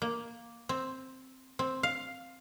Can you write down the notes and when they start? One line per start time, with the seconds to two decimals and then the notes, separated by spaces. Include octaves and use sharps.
0.02 A#3
0.69 C4
1.59 C4
1.83 F5